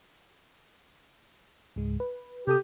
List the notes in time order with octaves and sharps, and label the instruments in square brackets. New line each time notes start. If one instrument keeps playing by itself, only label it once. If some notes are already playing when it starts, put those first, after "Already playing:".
[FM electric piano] C#2 G#2 G#3
B4
[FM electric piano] C3 A4 D#6 [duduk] G4